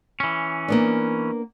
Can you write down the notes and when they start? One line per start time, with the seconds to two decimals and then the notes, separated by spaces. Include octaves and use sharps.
0.20 E3 C#4
0.68 A#3 B3 D4